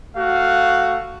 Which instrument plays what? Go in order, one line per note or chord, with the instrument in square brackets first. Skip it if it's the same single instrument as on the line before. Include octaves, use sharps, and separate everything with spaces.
[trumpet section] A3 F#4 F5